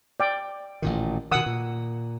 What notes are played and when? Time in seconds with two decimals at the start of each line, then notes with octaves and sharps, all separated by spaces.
0.20 D5 G5
0.82 A1 A#2 D#3
1.31 B2 D#3 F#5 D#6 E6
1.46 A#2